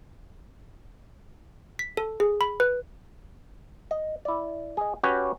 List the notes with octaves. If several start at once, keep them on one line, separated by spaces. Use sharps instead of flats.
B6
A4
G#4
B5
B4
D#5
E4 D5
G#4 D#5
C#4 F#4 G4 B4 C#5